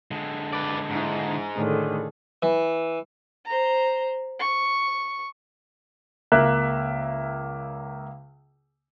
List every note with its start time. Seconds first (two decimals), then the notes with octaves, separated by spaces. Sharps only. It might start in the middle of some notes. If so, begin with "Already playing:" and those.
0.11 D3 G#3
0.53 B4 D5
0.91 G#2 D4 E4
1.56 A2 D3 D#3 G#4 A4
2.42 E3
3.45 C5 A#5
4.39 C#6
6.32 C#2 A#3 E5 F#6